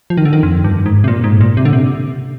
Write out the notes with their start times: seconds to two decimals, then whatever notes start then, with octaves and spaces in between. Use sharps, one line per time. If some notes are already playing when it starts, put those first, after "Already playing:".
0.10 F3
0.18 D#3
0.25 D3
0.33 D#3
0.43 F2
0.64 G2
0.86 G#2
1.04 C3
1.08 A#2
1.24 G#2
1.41 A#2
1.57 C3
1.65 D3
1.73 C3